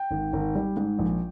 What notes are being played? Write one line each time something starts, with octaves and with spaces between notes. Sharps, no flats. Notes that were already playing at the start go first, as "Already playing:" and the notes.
Already playing: G5
G#1
G#1
G3
G#2
A#1